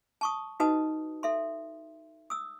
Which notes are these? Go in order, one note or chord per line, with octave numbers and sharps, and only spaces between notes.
A5 C#6 D#6
D#4 F#4 B4 D#5 A5 D#6
A4 E5 C6
D#6 E6